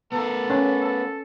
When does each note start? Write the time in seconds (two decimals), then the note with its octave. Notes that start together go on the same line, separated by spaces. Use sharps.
0.12 B3 A4 A#4
0.50 C#4
0.84 A4